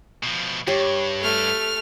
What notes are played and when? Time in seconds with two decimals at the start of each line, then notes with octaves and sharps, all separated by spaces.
0.23 B2 F3
0.67 G2 G4 C#5
1.21 A3 F6